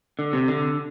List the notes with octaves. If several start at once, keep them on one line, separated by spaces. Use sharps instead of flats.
D3
C3
D3